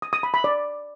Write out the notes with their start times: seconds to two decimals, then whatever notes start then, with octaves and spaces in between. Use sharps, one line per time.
0.02 D#6
0.13 D#6
0.23 B5
0.34 B5
0.44 D5